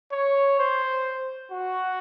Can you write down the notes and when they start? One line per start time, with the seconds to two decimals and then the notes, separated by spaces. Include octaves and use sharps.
0.12 C#5
0.59 C5
1.51 F#4